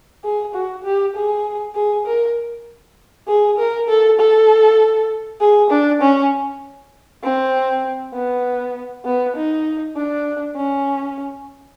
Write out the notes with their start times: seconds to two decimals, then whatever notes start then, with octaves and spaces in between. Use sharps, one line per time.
0.24 G#4
0.54 F#4
0.84 G4
1.15 G#4
1.75 G#4
2.06 A#4
3.28 G#4
3.58 A#4
3.88 A4
4.19 A4
5.41 G#4
5.70 D4
6.01 C#4
7.23 C4
8.13 B3
9.05 B3
9.36 D#4
9.96 D4
10.56 C#4